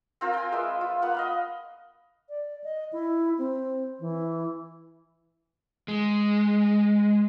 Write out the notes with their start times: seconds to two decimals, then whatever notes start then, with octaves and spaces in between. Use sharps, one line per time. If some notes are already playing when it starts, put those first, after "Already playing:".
0.21 C4 F4 A#4
0.34 G5 G#5
0.52 G#3 A#3 B4 E5
0.81 F4
1.02 A#3 B3 F#5
1.15 D#5 F5 B5
2.29 D5
2.64 D#5
2.92 E4
3.38 C4
4.00 E3
5.88 G#3